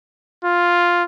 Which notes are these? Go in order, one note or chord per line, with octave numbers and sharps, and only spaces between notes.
F4